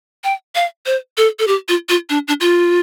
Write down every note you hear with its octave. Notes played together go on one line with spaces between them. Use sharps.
G5
F5
C5
A4
A4
G4
F4
F4
D4
D4
F4